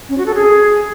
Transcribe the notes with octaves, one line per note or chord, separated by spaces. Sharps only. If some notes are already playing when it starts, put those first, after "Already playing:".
C#4
F#4
A4
G#4